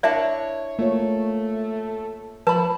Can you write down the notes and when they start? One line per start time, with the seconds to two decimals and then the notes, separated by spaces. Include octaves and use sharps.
0.03 D4 E4 C#5 D5 E5 A5
0.79 A3 A#3 F4 C#5
2.47 F3 B4 A5 B5